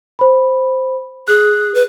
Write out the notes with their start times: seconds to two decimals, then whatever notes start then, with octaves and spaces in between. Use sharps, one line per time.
0.19 C5 B5
1.28 G#4 F#6
1.75 B4